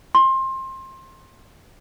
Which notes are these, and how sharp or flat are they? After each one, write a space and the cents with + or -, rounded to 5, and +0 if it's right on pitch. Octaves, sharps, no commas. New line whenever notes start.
C6 +20